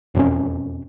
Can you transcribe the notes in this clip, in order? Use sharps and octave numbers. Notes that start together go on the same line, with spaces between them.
E1 F2 C#4